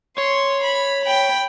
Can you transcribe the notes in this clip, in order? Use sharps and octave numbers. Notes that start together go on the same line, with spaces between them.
C#5 C6
B5
G5 B5